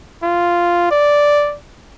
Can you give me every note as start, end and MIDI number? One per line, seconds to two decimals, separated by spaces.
0.23 0.89 65
0.91 1.56 74